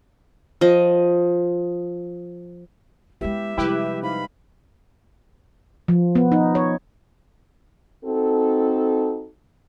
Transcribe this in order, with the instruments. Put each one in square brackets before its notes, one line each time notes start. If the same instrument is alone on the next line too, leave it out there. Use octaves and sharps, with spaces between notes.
[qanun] F3 D#5
[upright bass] G#3 B3 [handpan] E4 G4 B4 [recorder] E5
[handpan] C3 G3 G#3 [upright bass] F3 [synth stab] E4 G4 B4
[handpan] D#4 C5 F5 [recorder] B5
[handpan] F3
B3
D#4
C#5
[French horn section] C4 D#4 F#4 A4